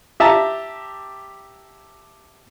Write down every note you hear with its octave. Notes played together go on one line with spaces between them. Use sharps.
G4 E5 A5 A#5